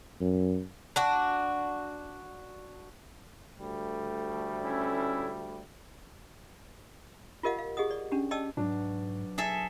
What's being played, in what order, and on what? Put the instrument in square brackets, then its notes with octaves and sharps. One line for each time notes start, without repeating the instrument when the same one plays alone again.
[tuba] F#2
[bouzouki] D4 F#4
[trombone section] D2 G3 A3
[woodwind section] C#4 E4
[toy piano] F4 G4 A#4 D#5 F5 F#5
F5
G4 G#4 D#5 F#5 D#6
D5
C#4 D4 G4
D5 D#5 G5 A5 D6 E6
[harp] B1 F#3 D6 [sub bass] G#2 [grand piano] D4
[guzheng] G#4 A4 E5